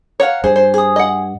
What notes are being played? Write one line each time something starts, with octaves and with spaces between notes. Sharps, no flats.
C#5 F5 F#5 A#5
G2 G#4 C5
C5
G#4 D#6
D#5 F#5